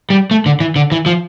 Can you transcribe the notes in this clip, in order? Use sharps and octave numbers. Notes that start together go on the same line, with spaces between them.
G3
A3
D3
E3
D3
E3
F3